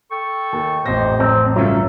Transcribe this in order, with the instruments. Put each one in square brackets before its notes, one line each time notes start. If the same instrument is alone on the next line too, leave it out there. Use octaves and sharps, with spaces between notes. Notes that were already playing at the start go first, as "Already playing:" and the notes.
[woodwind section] A4 G5 C#6
[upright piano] D#2
[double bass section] A1 [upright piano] F2 D#5 A#6 [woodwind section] C3 C5
[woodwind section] F3 F#3 [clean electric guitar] C4
[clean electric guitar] G2 C#3 F#3 [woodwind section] D#4 A4 [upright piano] F4 C#5 E5